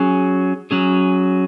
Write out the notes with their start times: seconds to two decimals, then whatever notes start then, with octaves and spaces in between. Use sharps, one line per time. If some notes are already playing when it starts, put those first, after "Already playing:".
Already playing: F#3 C#4 G#4
0.71 F#3 C#4 G#4